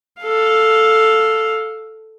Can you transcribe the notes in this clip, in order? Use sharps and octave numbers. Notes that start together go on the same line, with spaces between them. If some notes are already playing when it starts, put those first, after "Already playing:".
A4 F5